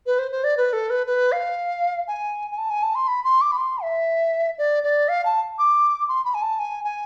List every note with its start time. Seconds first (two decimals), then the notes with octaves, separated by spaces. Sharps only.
0.06 B4
0.19 C5
0.31 C5
0.44 D5
0.57 B4
0.73 A4
0.90 B4
1.07 B4
1.32 F5
2.08 G#5
2.51 G#5
2.58 A5
2.70 G#5
2.83 A5
2.95 C6
3.08 B5
3.24 C6
3.41 D6
3.52 B5
3.57 C6
3.83 E5
4.58 D5
4.84 D5
5.09 F5
5.25 A5
5.59 D6
6.08 C6
6.25 B5
6.34 G#5
6.42 A5
6.59 G#5
6.84 G#5